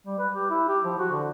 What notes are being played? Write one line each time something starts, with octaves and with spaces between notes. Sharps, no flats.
G3
B4
G4
E4
G4
F3
F#4
D3